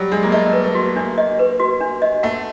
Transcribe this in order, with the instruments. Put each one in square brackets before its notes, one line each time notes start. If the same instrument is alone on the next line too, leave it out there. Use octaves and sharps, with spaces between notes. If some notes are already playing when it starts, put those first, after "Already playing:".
Already playing: [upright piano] F#3 G3
[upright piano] G#3 [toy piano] D4
[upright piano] A#3
[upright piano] A3 [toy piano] D#5
[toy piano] B4
[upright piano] A3
[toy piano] F#4
[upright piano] A#3 [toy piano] D4
[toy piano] D#5
B4
F#4
D4
D#5
[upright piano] A3 [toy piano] F#5